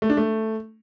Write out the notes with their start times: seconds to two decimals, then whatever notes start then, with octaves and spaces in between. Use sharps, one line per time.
0.02 A3
0.10 D4
0.17 A3